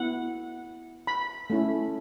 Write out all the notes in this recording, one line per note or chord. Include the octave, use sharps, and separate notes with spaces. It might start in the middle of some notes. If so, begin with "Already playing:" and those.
Already playing: B3 E4 F#5
B5
A3 C#4 E4